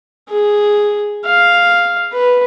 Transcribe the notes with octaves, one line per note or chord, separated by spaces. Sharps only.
G#4
F5
B4